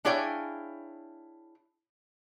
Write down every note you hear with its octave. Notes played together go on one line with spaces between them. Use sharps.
D4 E4 G#4 C#5 F5 G5